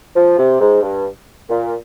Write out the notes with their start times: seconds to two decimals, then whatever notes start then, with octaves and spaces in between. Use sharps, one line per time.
0.16 F3
0.38 C3
0.61 G#2
0.82 G2
1.49 A#2